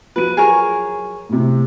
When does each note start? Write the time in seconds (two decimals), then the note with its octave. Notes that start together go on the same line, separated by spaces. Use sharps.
0.16 F3 F#3 B4 D#7
0.37 G#4 A#4 C#5
1.29 A2 C3